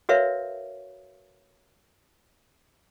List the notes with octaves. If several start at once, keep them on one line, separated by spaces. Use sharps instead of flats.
F#4 A#4 B4 C#5 E5 F5